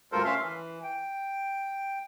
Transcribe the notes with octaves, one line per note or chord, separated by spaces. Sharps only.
D2 G2 F4 A4 A#4 C5
C#4 E5 F5 C6
E3
G5